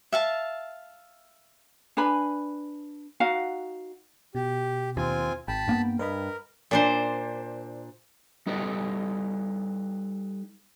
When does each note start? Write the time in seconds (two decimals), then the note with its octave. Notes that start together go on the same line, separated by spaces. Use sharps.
0.12 E5 F5 A5
1.97 D4 B4 G#5 B5
3.20 D#4 F#4 F5 F#5
4.35 B2 G4
4.97 D#2 C4 F4 G#5
5.48 G#1 G5 A5 B5
5.68 G2 A#3 B3
5.99 G2 A#4 B4 D#5 B5
6.71 A#2 D4 C5
8.47 G3 D#4 A4 B4